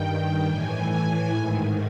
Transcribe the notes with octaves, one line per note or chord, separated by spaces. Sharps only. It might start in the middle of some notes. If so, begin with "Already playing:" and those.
Already playing: G2 D#3 G5
A2 E3 G#5
G#2 D#3